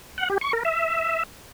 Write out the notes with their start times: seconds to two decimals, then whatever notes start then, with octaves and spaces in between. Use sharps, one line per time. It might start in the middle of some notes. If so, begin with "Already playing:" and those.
0.18 F#5
0.30 G4
0.41 C#6
0.53 A#4
0.65 E5